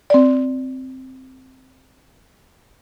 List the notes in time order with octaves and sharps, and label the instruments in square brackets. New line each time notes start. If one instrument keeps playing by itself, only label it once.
[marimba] C4 D5